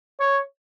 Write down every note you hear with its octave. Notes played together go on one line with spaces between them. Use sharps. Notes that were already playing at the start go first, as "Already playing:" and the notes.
C#5